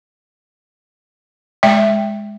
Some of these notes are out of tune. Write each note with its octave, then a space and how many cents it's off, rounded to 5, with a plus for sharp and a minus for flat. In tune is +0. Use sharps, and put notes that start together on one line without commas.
G#3 +0 E5 +0 G5 +0